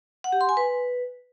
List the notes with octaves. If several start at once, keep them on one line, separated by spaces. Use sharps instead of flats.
F#5
G4
C6
G#5
B4